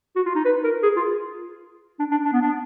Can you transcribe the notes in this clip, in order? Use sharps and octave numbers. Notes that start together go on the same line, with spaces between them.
F#4
F4
D#4
B4
A#4
G#4
F4
D4
D4
D4
B3
D4